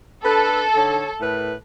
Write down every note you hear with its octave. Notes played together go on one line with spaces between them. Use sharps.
D4 A4 B4
D3 D#4 C#5
A2 A#4 B4